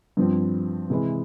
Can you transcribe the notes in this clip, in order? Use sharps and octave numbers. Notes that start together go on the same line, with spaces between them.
G2 F3 C4
C3 E3 G#3 E4